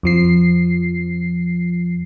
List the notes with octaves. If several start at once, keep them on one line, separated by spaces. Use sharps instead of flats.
F2 F3 C7